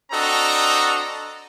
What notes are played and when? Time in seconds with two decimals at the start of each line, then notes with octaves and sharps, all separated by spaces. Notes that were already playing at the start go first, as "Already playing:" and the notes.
0.11 C4 D4 F#4 A4 D#5 A#5